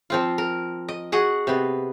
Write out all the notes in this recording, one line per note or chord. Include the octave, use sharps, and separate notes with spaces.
F3 C4 F4
A#4
D#5
F#4 G#4 D#5 F#5
C3 B3